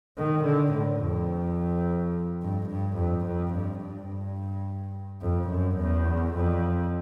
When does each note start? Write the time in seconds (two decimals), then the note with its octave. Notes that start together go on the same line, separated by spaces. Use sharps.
0.18 D#3
0.45 D3
0.73 A2
1.02 F2
2.42 G2
2.70 G2
2.97 F2
3.26 F2
3.53 G2
3.82 G2
5.22 F2
5.50 F#2
5.78 E2
6.34 F2